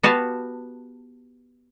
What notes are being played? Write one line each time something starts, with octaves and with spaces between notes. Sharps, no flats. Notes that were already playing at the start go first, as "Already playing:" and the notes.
B3 F#4 G4 B4 F5 A5